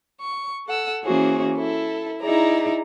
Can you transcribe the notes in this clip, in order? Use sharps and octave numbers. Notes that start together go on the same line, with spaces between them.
C#6
A4 F#5 E6
E3 A#3 C#4 F#4 G#4 C5
E4 A4
D#4 E4 G#4 D5 A#5